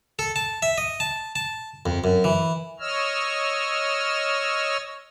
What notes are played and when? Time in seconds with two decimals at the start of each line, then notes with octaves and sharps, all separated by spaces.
0.19 A4
0.36 A5
0.62 E5
0.78 D#5
1.00 A5
1.35 A5
1.86 F2
2.04 F#2
2.24 E3
2.80 C#5 D#5 E6 F6